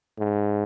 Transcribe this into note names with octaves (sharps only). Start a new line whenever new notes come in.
G#2